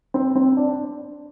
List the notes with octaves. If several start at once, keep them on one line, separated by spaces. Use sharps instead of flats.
C4
C4
D4